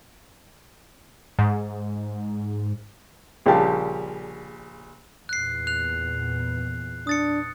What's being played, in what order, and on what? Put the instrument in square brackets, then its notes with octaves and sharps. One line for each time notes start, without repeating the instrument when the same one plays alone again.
[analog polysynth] G#2
[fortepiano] A#1 C#3 F3 G3 G4 A5
[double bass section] E2 A#2 [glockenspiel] F#6 C7
[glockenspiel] F#6 F7
[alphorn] D4 [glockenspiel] D#6 A6 C#7